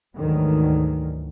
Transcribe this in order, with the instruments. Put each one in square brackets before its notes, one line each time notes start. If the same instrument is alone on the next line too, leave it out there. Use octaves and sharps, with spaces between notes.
[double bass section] D2 G#2 D#3 E3 F#3